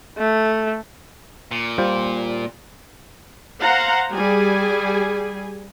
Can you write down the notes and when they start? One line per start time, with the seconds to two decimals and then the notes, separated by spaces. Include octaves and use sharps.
0.18 A3
1.51 A#2
1.78 G3 F4 C5
3.60 C5 F5 F#5 A#5
4.13 G3 G#4 G#5